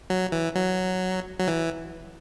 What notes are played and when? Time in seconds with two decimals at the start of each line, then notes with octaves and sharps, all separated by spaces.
0.10 F#3
0.32 E3
0.55 F#3
1.39 F#3
1.48 E3